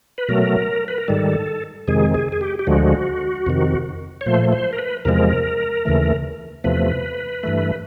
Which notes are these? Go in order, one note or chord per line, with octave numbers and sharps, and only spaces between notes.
B4
B2 F#3 A3 A#4
B4
A#4
G#2 D#3 G3 A4
F2 C3 D#3 G#3 G#4
G#4
G#4
G4
G4
D2 D3 F3 G#3 F#4
F2 C3 D#3
C#5
A#2 F3 A3 C5
C5
A#4
B4
E2 C3 F3 G#3 A#4
D#2 C#3 E3 A3
E2 C3 F3 A3 B4
G2 E3 A3